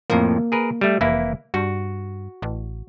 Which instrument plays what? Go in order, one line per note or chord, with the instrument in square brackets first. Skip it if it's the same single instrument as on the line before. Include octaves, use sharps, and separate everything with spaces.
[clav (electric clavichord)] F2 A2 F3 [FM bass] A#3
[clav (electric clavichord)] G#4 A#4 B4
G3 A3
[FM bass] F1 [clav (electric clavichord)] E3 A#3 E4
[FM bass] G2 [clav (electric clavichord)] F#4
[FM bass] A1